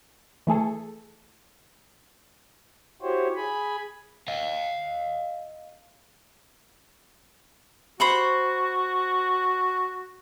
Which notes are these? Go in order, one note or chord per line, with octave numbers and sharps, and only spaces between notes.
E3 A3 G#4 A4
E4 F#4 G4 C5 C#5
G#4 G#5 B5
D#5 F5
F#4 C5 B5 C#6